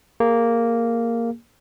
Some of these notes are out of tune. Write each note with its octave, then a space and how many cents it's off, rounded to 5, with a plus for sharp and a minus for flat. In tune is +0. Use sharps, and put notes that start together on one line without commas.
A#3 -5 G#4 +0